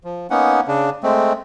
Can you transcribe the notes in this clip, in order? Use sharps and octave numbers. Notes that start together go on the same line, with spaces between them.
F3
A#3 B3 C#4 D#4 F#5
C#3 D4
G#3 A3 C4